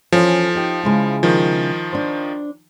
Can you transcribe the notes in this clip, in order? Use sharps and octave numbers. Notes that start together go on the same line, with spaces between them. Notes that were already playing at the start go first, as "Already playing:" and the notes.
E3 F3 C#4 A4
D#4 G4 G5
C#3 G#3 E4
D#3 F3
D4 C5